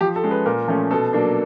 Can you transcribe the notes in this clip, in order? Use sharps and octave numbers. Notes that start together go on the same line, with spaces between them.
F3 G4
A4
G#3 C#4
B4
A#2 A#4
F3 A3 C#4
B2 A4
F#3 A#3 D4